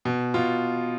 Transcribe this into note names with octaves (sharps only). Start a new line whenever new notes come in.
B2
B2 F4